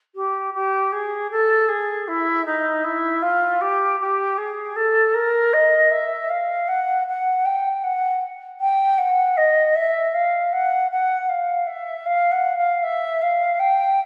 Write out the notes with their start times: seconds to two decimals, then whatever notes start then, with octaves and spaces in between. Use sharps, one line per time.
0.15 G4
0.54 G4
0.92 G#4
1.31 A4
1.69 G#4
2.08 E4
2.46 D#4
2.84 E4
3.22 F4
3.61 G4
4.00 G4
4.38 G#4
4.76 A4
5.14 A#4
5.53 D#5
5.91 E5
6.30 F5
6.68 F#5
7.07 F#5
7.45 G5
7.84 F#5
8.60 G5
8.98 F#5
9.37 D#5
9.76 E5
10.14 F5
10.53 F#5
10.91 F#5
11.29 F5
11.67 E5
12.06 F5
12.32 F#5
12.57 F5
12.83 E5
13.22 F5
13.60 G5